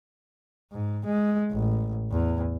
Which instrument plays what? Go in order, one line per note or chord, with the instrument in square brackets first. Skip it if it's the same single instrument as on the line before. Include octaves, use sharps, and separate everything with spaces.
[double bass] G#2
G#3
A1
E2